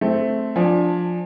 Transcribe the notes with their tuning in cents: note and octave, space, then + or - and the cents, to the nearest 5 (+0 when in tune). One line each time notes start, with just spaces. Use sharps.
A3 -5 C4 +0
F3 +15 D4 +15 G#5 +0